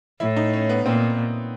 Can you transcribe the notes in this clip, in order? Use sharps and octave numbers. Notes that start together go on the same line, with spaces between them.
A2 E4
D#4
C#4
B3
A#2 C4